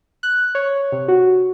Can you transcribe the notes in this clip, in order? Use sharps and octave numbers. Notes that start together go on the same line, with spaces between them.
F#6
C#5
C3
F#4